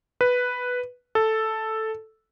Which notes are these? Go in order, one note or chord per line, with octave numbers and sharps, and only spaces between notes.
B4
A4